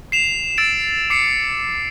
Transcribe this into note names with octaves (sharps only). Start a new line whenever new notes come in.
C7 E7 F7
E6 A6 D7
D6 C7 C#7